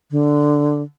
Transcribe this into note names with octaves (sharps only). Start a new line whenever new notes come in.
D3